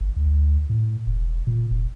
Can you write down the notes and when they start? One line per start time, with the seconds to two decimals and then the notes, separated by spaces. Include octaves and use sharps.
0.01 G1
0.17 D2
0.70 A2
1.07 E1
1.47 A#2
1.71 E1